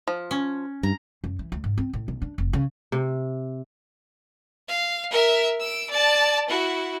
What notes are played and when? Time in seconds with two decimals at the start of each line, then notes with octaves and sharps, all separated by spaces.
0.08 F3
0.31 C#4
0.83 G2 A#5
1.24 F#2
1.39 E3
1.52 D2
1.64 G#2
1.78 C4
1.93 A2
2.08 B1
2.22 D4
2.38 F1
2.53 C#3
2.92 C3
4.68 F5
5.11 A#4 E5
5.60 E6 D7
5.90 D5 A5
6.49 E4 F#4